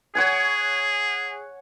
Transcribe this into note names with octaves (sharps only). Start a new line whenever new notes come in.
G#4 C#5 F#5 G#5